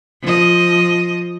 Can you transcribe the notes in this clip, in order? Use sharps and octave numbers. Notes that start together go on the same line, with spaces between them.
F3 D#5